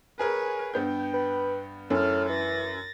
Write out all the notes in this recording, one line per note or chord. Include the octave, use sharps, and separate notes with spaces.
G#4 A#4 B4 C#5 G#5
G2 B3 G5 G6
B4
F#2 A2 A5 F6
E3 A6 A#6